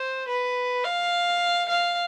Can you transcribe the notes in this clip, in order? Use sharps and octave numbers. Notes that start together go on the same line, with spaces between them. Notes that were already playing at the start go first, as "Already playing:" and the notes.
Already playing: C5
B4
F5
F5